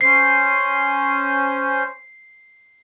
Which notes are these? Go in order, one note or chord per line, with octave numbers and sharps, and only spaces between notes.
C#4 C5 C7